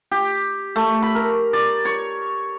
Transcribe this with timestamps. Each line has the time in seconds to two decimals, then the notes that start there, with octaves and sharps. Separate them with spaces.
0.11 G4
0.76 A3
1.02 B5
1.15 A#4
1.53 D5
1.85 C#5